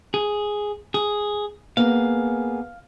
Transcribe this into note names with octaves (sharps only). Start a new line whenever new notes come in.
G#4
G#4
A#3 B3 G#4 F5